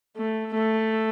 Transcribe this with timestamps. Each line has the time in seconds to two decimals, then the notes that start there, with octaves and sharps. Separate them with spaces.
0.16 A3
0.54 A3